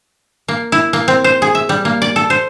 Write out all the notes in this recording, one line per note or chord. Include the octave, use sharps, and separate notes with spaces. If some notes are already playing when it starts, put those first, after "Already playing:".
A#3
E4
A#3
C4
C5
G#4
E5
G3
A#3
D5
A4
C5